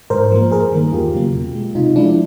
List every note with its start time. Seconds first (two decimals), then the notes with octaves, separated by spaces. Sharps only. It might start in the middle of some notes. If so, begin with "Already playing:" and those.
0.10 G#2 A#4 C5
0.32 F3 A#3
0.51 G2 G#4 A#4
0.72 D#3 G3 A#3
0.93 E2 F4 G4
1.14 C#3 F#3 A#3
1.34 B2
1.55 G#3
1.75 C3 D#4 F4
1.96 F3 G#3 D4 E4